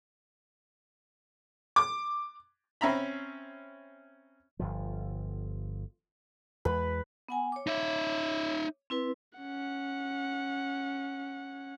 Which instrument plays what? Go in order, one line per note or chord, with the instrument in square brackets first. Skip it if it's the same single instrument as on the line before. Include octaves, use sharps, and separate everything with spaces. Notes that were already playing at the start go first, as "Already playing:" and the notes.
[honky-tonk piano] D6
[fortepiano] C4 C#4 E5 A#5 B5
[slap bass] G1 C#2 F3
[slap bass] E2 G#3 [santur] B4
[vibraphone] B3 F#5 G#5
C#5 D6
[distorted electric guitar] D#4 E5
[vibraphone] C4 E4 B4
[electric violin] C#4 F#5